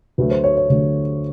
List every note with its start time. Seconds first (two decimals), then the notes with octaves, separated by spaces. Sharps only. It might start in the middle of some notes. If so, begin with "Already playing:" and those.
0.18 D2 D3 F#3 A3 B4
0.31 C5
0.44 C#5
0.57 C#5
0.70 D2 D3 F#3 A3